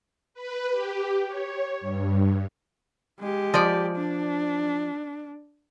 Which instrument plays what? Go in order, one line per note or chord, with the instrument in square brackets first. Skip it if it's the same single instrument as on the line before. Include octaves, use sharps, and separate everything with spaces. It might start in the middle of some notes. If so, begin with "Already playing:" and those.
[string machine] B4
G4
C#5
G2
[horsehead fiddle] G#3 G4
[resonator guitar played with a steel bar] F3 D5
[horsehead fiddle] D4